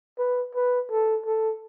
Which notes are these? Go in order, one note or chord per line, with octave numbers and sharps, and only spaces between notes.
B4
B4
A4
A4